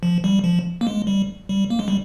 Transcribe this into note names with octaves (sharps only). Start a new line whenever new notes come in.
F3
G3
F3
A#3
G#3
G3
G3
A#3
G#3
G3